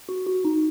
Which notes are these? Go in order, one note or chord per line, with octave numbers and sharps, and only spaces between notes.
F#4
F#4
D#4